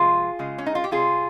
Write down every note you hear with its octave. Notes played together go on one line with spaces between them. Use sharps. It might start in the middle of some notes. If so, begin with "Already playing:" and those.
Already playing: C3 F3 G#3 F4 G#4
C#3 G#3
C#4
D#4
F4
G4
C3 G3 F4 G#4